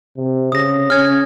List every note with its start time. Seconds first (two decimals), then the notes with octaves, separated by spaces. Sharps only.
0.17 C3
0.52 C#3 D#6 A#6
0.90 C#4 F6 G#6